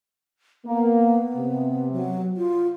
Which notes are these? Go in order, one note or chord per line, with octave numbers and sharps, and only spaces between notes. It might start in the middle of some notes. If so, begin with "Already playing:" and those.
A#3 B3
C3
F#3
F4